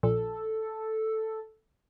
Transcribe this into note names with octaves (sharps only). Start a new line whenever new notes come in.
A#1 A4